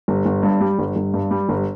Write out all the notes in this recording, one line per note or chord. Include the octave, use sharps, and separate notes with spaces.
G1
G1
G2
G3
G1
G1
G2
G3
G1